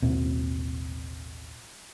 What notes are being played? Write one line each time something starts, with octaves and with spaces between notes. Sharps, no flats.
A1 D#2 B2 C4